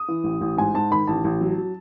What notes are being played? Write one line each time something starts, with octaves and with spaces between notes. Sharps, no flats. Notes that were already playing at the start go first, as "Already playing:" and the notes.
Already playing: D#6
E3
A1
A1
G#2 G#5
G#2 A5
D#3 B5
A1 A5
A1
F#3
F#3